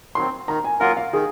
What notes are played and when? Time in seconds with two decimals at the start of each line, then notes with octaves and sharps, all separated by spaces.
0.15 D#3 F#3 C4 C6
0.47 D#3 A#5
0.64 G#5
0.80 F#3 A#3 F4 A#4 F#5
0.97 F5
1.13 D#3 G#4